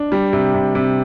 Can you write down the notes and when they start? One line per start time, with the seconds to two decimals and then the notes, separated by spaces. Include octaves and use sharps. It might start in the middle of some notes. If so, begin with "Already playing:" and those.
Already playing: D4
0.12 G3
0.33 C3
0.54 C3
0.75 C3